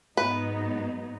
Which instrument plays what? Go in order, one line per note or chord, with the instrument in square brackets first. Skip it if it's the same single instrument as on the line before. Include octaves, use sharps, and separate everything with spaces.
[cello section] G#2 F#3 B3 D#4 [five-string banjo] B4